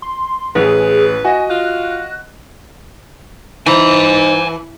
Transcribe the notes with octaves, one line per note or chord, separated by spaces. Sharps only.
C6
A1 G#4 B4
F#4 D#5 G#5
F4 F#6
E3 D#4 C5 G#5 A#5